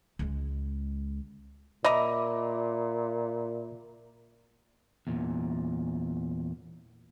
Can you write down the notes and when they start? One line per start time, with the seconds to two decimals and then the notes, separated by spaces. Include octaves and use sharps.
0.19 C#2 G#3
1.84 A#2 D#5 E5 A#5 B5 D6
5.07 E2 A#2